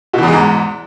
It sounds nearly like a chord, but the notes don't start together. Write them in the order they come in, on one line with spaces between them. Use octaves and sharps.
B2 E3 E2 G#3 G#2